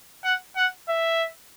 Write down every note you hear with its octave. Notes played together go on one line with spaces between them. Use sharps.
F#5
F#5
E5